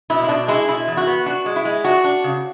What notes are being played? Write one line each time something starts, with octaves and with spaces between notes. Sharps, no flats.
B2 E4
E4
B2 D4
G#3 E4
B2 E4
E2
F#4
B3
D4 F#4
G#3
E4
G#3
D4 F#4
D4
C#3